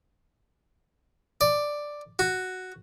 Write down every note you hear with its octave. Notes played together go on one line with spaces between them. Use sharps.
D5
F#4